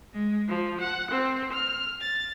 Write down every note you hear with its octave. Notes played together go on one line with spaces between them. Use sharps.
G#3
F3
F#5
C4
F6
A6